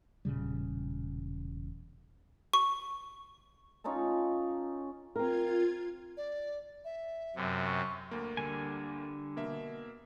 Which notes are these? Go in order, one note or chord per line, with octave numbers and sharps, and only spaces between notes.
E1 A#2 C#3 G3
C#6
C#4 D#4 F4 A4
C4 F4 A#4 G#6
D5
E5
F#2 C3
C#6
D2 A#3
D3 G3 G#5
B2 A#3 E5